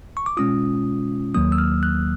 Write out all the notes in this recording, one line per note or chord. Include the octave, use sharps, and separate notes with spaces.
C#6
D6
B2 G#3 C#4 F4 D#6
D#2 D#3 F#3 A#3 D#6
E6
F6
F#6